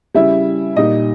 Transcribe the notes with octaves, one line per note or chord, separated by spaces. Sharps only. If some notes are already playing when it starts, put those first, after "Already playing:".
C#3 G3 E4 E5
A#2 G3 D#4 D#5